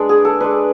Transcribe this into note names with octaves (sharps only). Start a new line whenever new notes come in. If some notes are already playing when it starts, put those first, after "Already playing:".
Already playing: G#3 D4 B4 D5
G#4
A4
G#3 D4 B4